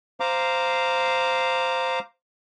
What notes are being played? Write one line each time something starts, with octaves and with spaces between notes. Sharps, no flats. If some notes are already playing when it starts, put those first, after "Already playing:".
C5 F5 A#5 D6